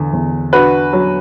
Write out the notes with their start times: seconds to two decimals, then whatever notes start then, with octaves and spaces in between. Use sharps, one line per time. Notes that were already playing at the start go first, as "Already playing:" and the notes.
Already playing: E2 D3
0.13 E2
0.53 D4 F#4 B4
0.93 F#3